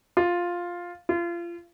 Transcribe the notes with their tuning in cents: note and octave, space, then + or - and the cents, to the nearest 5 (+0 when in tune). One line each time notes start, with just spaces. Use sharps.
F4 +5
F4 -30